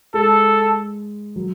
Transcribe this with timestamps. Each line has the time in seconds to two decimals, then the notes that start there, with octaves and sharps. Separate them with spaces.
0.14 G#3 A4
1.36 F#3